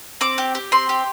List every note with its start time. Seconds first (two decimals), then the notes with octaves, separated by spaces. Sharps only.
0.21 C4 D6
0.38 G4
0.55 G4
0.72 C4 C6
0.89 G4